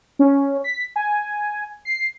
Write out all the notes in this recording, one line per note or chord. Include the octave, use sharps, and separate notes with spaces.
C#4
B6
G#5
C7